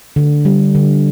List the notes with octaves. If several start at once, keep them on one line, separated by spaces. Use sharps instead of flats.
D3
G3
D3